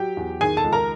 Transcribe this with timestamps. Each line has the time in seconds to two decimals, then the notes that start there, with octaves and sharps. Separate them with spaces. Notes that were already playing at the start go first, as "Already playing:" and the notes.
Already playing: F#3 G4 G5
0.17 E2
0.41 D#3 G#4 G#5
0.57 A4 A5
0.64 C#2
0.73 A#4 A#5